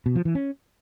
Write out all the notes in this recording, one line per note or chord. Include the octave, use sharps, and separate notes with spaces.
B2
F3
E3
C#4